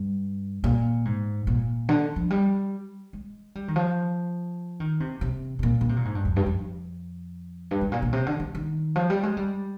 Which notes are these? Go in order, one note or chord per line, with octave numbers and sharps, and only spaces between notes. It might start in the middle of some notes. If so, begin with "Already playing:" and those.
Already playing: G2
A#2
G#2
A#2
D3
F3
G3
G#3
G3
D#3
F3
D#3
C3
C3
C3
A#2
D3
C3
A#2
G#2
G2
F2
G2
F2
G2
G#2
A#2
A#2
C3
D3
D3
D#3
F3
G3
G#3
G3